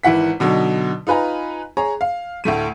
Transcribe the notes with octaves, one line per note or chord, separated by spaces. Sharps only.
G#1 E3 E4 F#5 B6
B2 D3 F#3 D#4
D#4 F4 B4 G#5 A#5
G#4 C#5 A#5
F5
D2 A2 A3 D#7